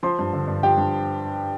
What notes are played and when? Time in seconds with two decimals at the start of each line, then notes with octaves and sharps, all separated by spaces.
0.03 F3 C5 C6
0.19 G2
0.33 D3
0.47 G2
0.63 F3 G4 G5
0.77 G2